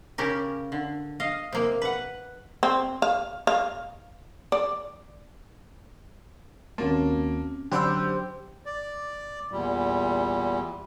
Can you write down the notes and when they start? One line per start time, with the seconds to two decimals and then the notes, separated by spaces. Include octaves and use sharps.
0.18 C#3 C#4 G4 A#4
0.72 D3
1.20 D#5 F5
1.52 C3 A#3
1.82 B4 F#5
2.63 C4
3.02 F5
3.47 F5
4.52 D5
6.78 D#2 A#3 C4 C#4 F#4 C#5 A5
7.72 D3 F#3 G4 C5 G5 B5 E6
8.66 D5
9.51 E2 A#2 G3